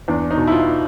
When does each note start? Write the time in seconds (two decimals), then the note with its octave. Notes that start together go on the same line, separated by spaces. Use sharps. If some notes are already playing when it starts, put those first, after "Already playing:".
0.08 E2 D4
0.31 D#4
0.37 B2
0.47 E4
0.52 F4